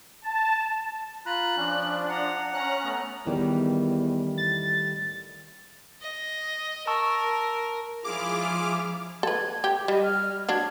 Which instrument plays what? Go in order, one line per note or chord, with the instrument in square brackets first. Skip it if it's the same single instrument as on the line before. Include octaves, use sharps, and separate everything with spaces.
[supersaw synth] A5
[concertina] F4 A#5 B5 [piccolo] F#6
[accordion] F3 D4 [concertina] C#4
[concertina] F#5 [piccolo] A#5
[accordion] C#4 F#6 [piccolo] A#5
[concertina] A3 B3
[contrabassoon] E2 [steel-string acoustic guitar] A2 D#3 G3
[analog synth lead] A6
[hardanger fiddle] D#5
[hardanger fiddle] A#4 [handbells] A5 C#6 E6
[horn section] G#2 C#4 F4 [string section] F3 E4 F6 [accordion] G#4 [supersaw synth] D6
[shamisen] A4 B4 [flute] G#6
[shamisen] G4
[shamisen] G3 [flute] D#5
[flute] F6
[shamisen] F#3 D4 [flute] G#6